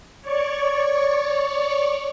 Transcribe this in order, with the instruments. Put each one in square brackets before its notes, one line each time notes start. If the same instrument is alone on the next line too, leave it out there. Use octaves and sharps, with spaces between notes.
[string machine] C#5 D5 C#6